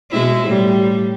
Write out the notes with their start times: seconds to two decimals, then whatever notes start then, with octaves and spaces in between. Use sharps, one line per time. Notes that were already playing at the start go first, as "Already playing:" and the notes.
0.11 B2 G#3 E4
0.46 A2 G3